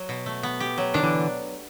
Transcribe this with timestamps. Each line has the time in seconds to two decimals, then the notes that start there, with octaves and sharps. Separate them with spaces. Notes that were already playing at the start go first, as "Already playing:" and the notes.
Already playing: F#3
0.09 B2
0.26 A3
0.43 B3
0.60 G4
0.78 F#3
0.94 D#3 D4
1.03 D3 E3